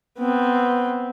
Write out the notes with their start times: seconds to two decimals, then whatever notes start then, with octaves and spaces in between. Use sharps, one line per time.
0.18 B3 C4